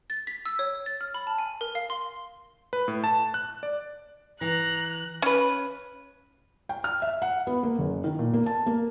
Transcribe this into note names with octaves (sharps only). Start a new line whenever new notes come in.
A6
B6
E6
C#5
A6
F6
B5
A5
G#5
A#4
F5
C6
B4
A2
A5
F#6
D5
E3 A#5 F#6
C#4 B4
G5
F6
E5
F#5
B3
A#3
F#1
D#3
A#2
A#3
A5
A#3